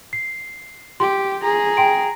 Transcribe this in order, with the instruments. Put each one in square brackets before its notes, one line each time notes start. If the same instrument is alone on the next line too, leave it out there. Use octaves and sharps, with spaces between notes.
[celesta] C7
[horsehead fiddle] G4 [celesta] C6
[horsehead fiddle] G#4 A#5
[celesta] G5 C6 D7